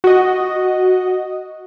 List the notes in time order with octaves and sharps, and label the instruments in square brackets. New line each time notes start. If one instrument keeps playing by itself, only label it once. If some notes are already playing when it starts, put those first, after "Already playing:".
[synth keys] F#4 D#5